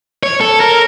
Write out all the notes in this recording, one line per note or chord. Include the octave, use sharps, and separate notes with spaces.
C#5
A4
A#4